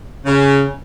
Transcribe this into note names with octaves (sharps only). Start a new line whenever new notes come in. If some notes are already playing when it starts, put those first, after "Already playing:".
C#3